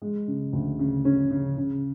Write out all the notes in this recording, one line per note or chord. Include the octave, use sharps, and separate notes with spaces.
G#3
C#3
D2
C#3
C#4
C#3
C#3